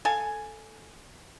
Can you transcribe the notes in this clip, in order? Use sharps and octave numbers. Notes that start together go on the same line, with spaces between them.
A4 F5 G#5